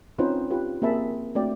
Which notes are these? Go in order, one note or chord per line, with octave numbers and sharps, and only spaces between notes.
C4 C#4 D#4 F4 B4 C5
F4 G4 B4
A#3 C4 G#4 E5 A5 B5
A3 C4 D4 F#4 D5 G5